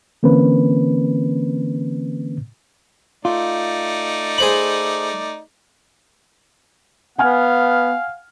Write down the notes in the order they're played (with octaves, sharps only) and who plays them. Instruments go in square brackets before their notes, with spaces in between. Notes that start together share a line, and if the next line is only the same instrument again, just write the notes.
[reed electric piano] D3 E3 A#3 C4 C#4 B4
[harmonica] A3 D#4 D5 [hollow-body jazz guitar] F4
[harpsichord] G#4 C5 B5
[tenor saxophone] B3 [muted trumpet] F5 [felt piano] F#5 G#5 F6